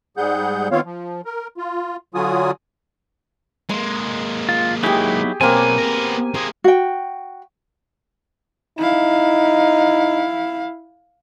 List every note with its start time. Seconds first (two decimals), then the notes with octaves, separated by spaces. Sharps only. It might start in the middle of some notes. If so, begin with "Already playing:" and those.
0.17 G#2 G3 G#4 F#5 G6
0.71 D#3 B3 C4 F4 C#5 F5
0.85 F3
1.25 A#4
1.57 F4
2.14 D3 F#3 F4 F#4 G#5 D#6
3.69 G#3 A#3 C6
4.49 F4
4.83 F#3 D#4 E4 G4 G#4
5.41 B2 F#3 A#3 C4 G#5
5.78 B3 A#4
6.34 A#3 G#4 C5
6.64 F#4 G5
8.78 D#4 E4 F5